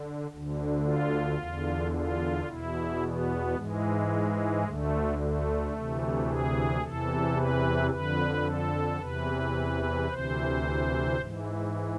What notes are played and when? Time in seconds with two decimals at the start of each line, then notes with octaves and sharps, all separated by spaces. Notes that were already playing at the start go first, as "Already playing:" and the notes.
Already playing: D3
0.29 D2 D3
0.83 F4
1.37 E2 D3
1.91 F4
2.46 E2 B2 E4
3.00 B3
3.55 G#2 E3 G#3
4.64 D2 D3 A3
5.18 A3
5.73 D2 C3 E3
6.26 G#4
6.81 E2 C3 E3 A4
7.36 B4
7.90 F2 D3 B4
8.44 A4
9.00 E2 C3 E3 B4
10.07 D2 C3 E3 C5
11.16 G#2 E3